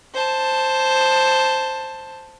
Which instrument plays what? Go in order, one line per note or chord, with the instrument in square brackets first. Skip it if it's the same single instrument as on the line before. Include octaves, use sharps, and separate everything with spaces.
[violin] C5 A5